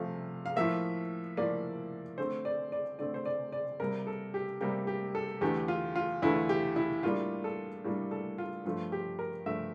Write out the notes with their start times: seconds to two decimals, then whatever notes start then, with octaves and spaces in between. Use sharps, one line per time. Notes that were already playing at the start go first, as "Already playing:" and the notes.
Already playing: C3 F3 A3 F5
0.46 F5
0.56 A2 F3 A#3 E5
1.37 A2 F3 A#3 D5
2.18 D3 A3 C4 C5
2.45 D5
2.72 D5
2.99 D3 A3 C4 D5
3.14 C5
3.26 D5
3.52 D5
3.80 C3 G3 A#3 A#4
4.07 A4
4.34 G4
4.61 C3 G3 A#3 G4
4.87 G4
5.15 A4
5.41 E2 D3 A3 G4
5.68 F4
5.96 F4
6.22 E2 D3 A3 E4
6.49 G4
6.76 E4
7.03 A2 G3 A#3 D4 F4
7.44 A4
7.84 A2 G3 A#3 D4
8.11 A4
8.38 F4
8.65 G2 F3 A3 F4
8.92 G4
9.19 A#4
9.46 G2 F3 A3 E5